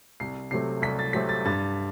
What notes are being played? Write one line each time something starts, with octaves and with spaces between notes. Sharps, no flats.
C2 C7
C3 F#3 A3 C4 C7
C2 B6
A6
C3 F#3 A3 C4 B6
A6
G2 A6